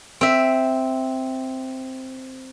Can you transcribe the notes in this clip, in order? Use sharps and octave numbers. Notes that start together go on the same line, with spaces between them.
C4 E5